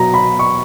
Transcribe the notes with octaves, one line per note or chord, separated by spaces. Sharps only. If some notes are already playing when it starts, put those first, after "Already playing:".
Already playing: B2 F#3 A#5
B5
C#6